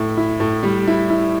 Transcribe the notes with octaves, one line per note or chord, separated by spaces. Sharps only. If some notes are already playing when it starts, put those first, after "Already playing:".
Already playing: A2 E4
E4
A2
G3
E4
E4